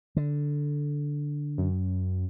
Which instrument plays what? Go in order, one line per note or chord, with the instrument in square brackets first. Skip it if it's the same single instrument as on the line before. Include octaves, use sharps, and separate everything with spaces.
[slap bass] D3
[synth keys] F#2